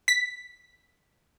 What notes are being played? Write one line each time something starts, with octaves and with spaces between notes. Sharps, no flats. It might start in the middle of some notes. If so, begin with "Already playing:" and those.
B6